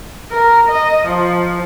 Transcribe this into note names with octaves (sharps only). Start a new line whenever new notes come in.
A#4
D#5
F3